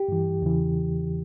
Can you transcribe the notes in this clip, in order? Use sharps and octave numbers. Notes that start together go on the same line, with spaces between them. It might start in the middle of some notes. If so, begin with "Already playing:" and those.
Already playing: G4
G2 E3
E2 C#3 E3